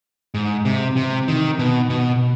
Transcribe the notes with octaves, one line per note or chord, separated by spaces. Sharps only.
G#2
C3
C3
D#3
B2
B2